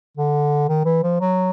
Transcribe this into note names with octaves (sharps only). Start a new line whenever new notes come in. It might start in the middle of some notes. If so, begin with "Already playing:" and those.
D3
D#3
E3
F3
F#3